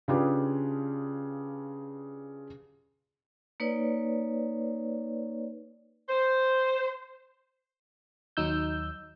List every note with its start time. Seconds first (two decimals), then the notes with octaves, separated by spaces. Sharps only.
0.08 C#3 D4 F4 G4 G#4 B4
3.60 A#3 D#4 B4 C#5 D5
6.09 C5
8.37 D#2 F#3 D#4 E6 G6